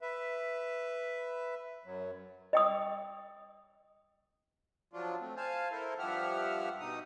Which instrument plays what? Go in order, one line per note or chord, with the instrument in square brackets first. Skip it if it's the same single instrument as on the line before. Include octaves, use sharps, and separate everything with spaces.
[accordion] B4 E5
F#2 F#3
[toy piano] D#5 G5 D#6
[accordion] F3 F#3 D4 F4
A3 C4
C5 F5 G#5 A5
E4 A4 A#4 C5
G2 F3 G4 E5 F#5 F6
B2 D#4 D#6